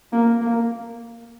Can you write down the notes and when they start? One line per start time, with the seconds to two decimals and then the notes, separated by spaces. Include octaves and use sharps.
0.12 A#3
0.42 A#3